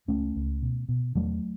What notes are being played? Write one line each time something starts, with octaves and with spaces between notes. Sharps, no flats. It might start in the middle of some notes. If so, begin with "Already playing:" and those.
C#2 A3 C#4
C#2
B2
B2
E2 F#3 A3